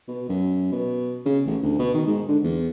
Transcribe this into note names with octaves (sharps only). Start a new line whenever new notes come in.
B2
F#2
B2
C#3
A1
D2
B2
D#3
G#2
D3
E2